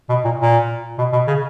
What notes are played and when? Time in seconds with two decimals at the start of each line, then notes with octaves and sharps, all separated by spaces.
0.09 B2
0.24 A#2
0.39 A#2
0.98 B2
1.12 B2
1.27 C#3